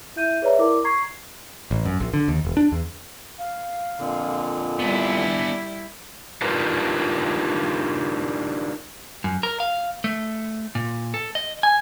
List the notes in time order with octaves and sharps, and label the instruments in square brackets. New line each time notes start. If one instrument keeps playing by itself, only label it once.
[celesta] E4 E5 G6 D#7
G#4 B4 C#5 D5 E5 A#5
E4 A#4 D5 D6
A#5 C#6 G#6 C7
[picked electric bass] A1
F#2
A#1
D3
D#2
E1
D4
E2
[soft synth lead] F5
[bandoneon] F2 A#2 D3
[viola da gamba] G3 E4 [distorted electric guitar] B3 D4 [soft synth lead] D5
[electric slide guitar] D4 D#4 F4 G4 A#4 B4
[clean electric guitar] F#2
A#4
F5
A3
A#2
A4
D#5
G#5